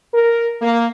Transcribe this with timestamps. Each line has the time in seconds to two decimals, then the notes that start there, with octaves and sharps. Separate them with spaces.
0.13 A#4
0.62 A#3